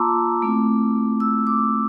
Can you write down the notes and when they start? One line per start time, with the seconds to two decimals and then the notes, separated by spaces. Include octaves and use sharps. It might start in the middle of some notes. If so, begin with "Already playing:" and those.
Already playing: A#3 F4 A5 A#5 C6 D6 E6
0.42 A3 C4 E4
1.20 E6
1.47 D6